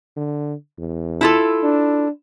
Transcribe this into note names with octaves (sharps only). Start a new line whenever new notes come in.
D3
E2
E4 F4 A4
D4